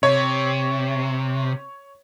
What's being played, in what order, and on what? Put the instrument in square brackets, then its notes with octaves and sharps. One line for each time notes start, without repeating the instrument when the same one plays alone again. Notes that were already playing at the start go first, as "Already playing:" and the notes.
[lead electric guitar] C3 [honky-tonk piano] C#5